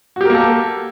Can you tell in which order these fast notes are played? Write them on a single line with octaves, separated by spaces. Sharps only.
F#4 G4 A#4 A#3 A4